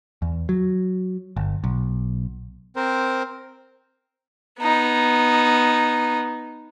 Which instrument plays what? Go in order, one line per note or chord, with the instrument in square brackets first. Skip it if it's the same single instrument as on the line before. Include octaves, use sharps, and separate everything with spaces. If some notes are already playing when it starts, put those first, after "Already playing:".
[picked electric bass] E2
F#3
G1
B1
[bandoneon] C4 A#4 C5
[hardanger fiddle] B3 D#4